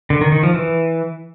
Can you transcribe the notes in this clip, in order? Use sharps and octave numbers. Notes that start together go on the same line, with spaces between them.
D3
D#3
D#3
F3
E3